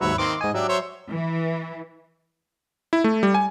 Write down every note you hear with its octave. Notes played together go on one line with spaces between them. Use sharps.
D#2 G#2 F#3 B4 C#5 E5
D#3 A#3 C4 C6 D6
G#2 D#5 G#5
F#3 D4 G4 E5
C5 C#5 E5
E3
E4
A3
G3
G#5